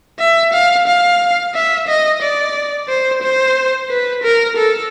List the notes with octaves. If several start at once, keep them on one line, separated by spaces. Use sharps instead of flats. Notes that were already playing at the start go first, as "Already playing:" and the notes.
E5
F5
F5
E5
D#5
D5
C5
C5
B4
A#4
A4